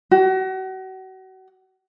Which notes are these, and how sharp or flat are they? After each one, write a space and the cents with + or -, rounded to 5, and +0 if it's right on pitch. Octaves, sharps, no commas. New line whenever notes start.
F#4 +35